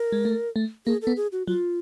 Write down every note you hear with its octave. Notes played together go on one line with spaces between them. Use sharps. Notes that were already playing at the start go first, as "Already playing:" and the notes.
Already playing: A#4
G#3
A3
A3
A#3 G#4
A4
B3
G#4
F#4
F#3 F4